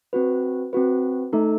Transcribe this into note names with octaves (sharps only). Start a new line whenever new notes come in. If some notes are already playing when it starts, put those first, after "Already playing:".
C4 F#4 B4
C4 F#4 B4
A3 D#4 A4